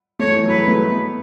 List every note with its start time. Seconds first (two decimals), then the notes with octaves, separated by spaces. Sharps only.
0.19 A3 C#5
0.34 E3
0.46 F#3 B4
0.57 G#3
0.68 A3
0.79 B3